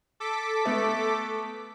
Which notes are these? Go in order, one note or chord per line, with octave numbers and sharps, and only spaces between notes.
A4 D6 B6
A3 B3